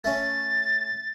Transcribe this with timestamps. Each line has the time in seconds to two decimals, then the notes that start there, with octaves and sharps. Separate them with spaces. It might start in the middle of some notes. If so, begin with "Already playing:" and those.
0.04 A3 C#4 A6